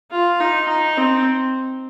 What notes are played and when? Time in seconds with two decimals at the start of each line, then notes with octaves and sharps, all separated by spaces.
0.11 F4
0.40 D#4
0.69 D#4
0.97 C4